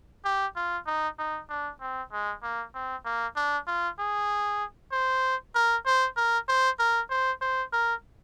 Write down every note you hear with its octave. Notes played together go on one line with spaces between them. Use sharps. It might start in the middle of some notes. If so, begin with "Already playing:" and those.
G4
F4
D#4
D#4
D4
C4
G#3
A#3
C4
A#3
D4
F4
G#4
C5
A#4
C5
A#4
C5
A#4
C5
C5
A#4